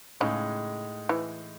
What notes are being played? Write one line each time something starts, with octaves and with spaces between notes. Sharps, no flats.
A2 C#3 G#3 D#4
E3